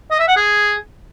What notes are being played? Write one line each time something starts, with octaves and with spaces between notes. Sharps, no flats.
D#5
E5
F#5
G#4